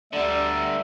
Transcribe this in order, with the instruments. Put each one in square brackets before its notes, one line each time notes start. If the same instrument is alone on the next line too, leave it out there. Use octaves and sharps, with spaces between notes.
[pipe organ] D2 F#5 A#5 [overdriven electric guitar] D3 G3 [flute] D5 [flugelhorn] E5